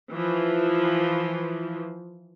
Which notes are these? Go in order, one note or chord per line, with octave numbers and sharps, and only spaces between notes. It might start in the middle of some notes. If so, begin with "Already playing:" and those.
E3 F3